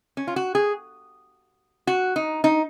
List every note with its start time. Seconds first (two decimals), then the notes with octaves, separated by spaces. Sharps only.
0.17 C#4
0.27 F4
0.36 F#4
0.55 G#4
1.87 F#4
2.16 D#4
2.44 D#4